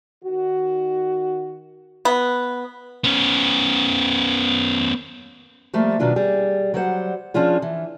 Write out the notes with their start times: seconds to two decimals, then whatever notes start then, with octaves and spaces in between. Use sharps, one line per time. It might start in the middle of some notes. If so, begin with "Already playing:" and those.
0.25 D#3 F#4
2.05 B3
3.04 B3 C#4
5.73 F3 G3 A3 A#3
5.99 B2 D#3 F#3 D4 F4
6.16 G3 G#4
6.74 F#3 G3 C5 F#5
7.34 F3 C#4 D4 F4 G#4
7.62 E3